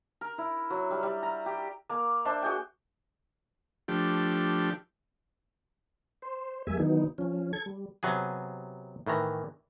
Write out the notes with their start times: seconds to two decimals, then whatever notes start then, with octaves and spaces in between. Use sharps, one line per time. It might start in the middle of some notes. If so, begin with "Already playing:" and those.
0.21 A#4
0.38 E4
0.70 F#3
0.90 G3
1.03 G3
1.23 A#5
1.46 G4
1.89 A#3 A#4
2.25 D4 C5 E5 C6
2.42 F#4 G#4 G5
3.88 F3 A3 D4 G4
6.22 C5
6.67 F2 G3 G#3 A#3 E5 G#5
6.79 D#3 E3 F#3 B3 D#4
7.18 F3 C#4
7.53 A4 G#6
7.66 G3
8.03 C3 F#3 B3 G#4
9.07 A2 D#3 E3 A#5